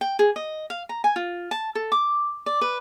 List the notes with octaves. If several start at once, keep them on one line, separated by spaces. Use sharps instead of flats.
G5
G#4
D#5
F5
A#5
G#5
F4
A5
A4
D6
D5
B4